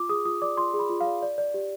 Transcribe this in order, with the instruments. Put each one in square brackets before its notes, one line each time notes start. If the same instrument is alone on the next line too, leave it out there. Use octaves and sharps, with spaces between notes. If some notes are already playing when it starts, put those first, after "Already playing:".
Already playing: [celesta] F4 D6
G#4 D#6
F4 D#6
D5 D6
F4 C6
G#4
B5
F4
F5
D5
D5
D5
G4